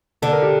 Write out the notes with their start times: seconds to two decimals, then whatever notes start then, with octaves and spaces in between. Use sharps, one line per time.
0.22 D3 D4 A4
0.32 A#4
0.42 G4